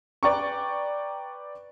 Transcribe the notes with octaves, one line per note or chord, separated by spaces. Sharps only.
B4 D5 G5 A#5 C#6